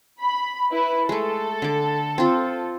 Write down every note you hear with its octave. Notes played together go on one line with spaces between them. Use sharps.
B5
E4 B4
G#3 A3 A4
D3 D6
C4 F4